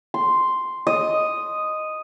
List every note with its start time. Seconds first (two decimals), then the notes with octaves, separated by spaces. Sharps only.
0.14 C6
0.87 D#5